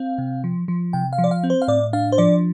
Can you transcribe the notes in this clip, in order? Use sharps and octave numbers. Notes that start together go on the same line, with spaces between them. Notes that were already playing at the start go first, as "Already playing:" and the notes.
Already playing: C4 F5
C3
F3
F3
C3 G5
F5
F3
D5
F5
C4
C5
F5
A2 D5
D4 F5
C5
F3 D5